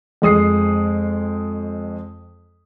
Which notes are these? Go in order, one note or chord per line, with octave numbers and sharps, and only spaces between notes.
F2 G#3 D#6 C7